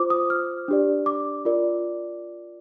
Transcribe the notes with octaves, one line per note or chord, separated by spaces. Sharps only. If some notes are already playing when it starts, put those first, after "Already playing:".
Already playing: F4 C5 D6
D#6
F6
D4 G4 D5
D6
F4 A#4 D5